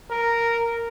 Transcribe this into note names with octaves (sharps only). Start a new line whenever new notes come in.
A#4